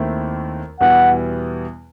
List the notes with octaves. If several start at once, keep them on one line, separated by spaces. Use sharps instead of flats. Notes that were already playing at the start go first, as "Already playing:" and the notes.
Already playing: D#2 D#3 A3 C4 E4
E2 B2 G3 B3 E4 F#5